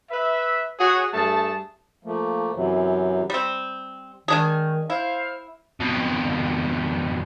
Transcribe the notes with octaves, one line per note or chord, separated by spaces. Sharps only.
B4 E5
F#4 G#4 C#5
G2 A3 G#4 A5
F3 A3 A#3
F#2 C3 E3 F#3
G3 C4
D#3 G#3 D4 G#4
E4 C5 F5
F2 B2